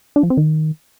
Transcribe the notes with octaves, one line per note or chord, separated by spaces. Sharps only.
D4
F3
C4
D#3